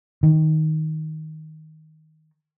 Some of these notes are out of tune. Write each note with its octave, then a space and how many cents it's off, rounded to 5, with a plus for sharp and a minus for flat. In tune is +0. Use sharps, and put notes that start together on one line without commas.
D#3 +10